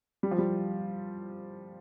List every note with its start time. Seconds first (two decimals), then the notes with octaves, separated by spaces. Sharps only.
0.23 G3
0.31 F3
0.38 G3